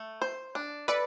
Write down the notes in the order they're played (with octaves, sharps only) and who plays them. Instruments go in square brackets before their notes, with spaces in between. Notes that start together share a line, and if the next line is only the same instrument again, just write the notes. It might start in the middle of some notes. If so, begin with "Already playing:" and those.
Already playing: [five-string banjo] A3
C5
D4
[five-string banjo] A4 [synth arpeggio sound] B4 D5